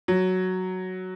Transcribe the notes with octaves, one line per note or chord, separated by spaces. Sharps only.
F#3